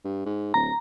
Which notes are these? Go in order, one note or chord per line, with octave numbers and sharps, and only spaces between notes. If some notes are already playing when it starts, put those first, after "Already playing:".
G2
G#2
D1 A#5